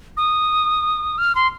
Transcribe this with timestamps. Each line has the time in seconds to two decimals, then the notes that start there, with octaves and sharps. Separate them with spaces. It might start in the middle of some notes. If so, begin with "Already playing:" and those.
0.17 D#6
1.18 F6
1.35 C6